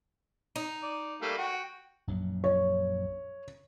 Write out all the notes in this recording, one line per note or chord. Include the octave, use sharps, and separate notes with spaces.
D#4
D5
G3 A3 A#3
F#4 G5
A#1 F#2 F#3
C#5